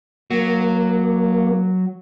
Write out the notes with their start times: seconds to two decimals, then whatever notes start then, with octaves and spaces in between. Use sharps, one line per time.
0.31 F#3 A#3